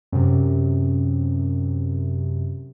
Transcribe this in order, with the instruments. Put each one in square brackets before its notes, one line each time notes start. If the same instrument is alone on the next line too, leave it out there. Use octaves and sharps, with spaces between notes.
[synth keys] F#2 C3